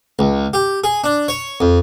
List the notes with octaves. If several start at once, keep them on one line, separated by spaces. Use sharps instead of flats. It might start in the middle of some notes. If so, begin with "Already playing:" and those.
C#2
G4
G#4
D4
C#5
F2